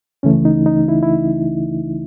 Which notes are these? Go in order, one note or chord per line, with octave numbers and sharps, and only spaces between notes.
C#2 C#3 E3 A3 C#4
D#4
D#4
E4
E4